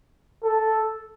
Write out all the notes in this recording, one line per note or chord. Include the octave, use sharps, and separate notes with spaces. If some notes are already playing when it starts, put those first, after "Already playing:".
A4